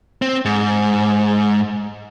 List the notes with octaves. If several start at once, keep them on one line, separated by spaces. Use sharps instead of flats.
C4
G#2